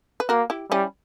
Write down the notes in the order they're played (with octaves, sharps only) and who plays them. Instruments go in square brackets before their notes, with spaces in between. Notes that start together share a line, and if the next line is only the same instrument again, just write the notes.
[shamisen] B4
[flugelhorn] A#3 [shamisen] F#4 A#4
[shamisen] E4 G4
[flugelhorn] G3 [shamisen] C#4 E4